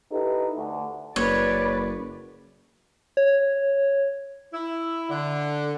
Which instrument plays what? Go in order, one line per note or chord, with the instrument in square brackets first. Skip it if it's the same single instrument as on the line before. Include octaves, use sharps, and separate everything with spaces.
[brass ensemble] D#4 E4 G4 A4 B4
D2
[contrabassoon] F#1 [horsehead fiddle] B4 D5 [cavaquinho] C#5
[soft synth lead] C#5
[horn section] E4
D3